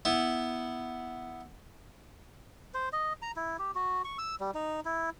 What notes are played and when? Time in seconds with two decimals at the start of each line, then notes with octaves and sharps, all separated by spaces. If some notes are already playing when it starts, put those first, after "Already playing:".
0.05 B3 E4
2.74 C5
2.92 D#5
3.22 A#5
3.36 E4
3.59 G4
3.75 F#4
4.04 C#6
4.19 E6
4.40 G3
4.55 D#4
4.85 E4